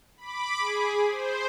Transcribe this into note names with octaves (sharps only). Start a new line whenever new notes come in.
B5 D6
G#4
C5